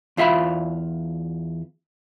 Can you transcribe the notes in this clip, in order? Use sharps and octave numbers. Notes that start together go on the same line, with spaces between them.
E2 F4 E5 F5 B5